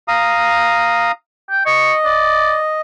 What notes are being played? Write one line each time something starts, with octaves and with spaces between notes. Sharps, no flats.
F5 A#5 D#6
G5
D#5 C#6
D5